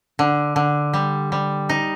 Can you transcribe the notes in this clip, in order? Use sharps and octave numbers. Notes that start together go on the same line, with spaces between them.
D3
D3
G3
G3
D#4